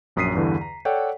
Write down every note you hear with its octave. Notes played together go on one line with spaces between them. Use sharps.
A#1 F#2 D#6 B6 C7 D#7
E2 G2 D3 E3
A#5
A4 C#5 D5 F#5 G5